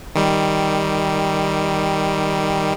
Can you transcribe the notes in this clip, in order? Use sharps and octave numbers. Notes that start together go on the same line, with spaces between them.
D#3 G3